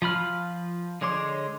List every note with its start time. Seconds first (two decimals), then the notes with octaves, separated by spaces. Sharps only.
0.02 F3 F4 B5 F6
1.01 D3 G#3 C#5 C6 D6